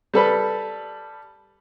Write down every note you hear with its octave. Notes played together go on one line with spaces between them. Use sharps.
G3 A4 B4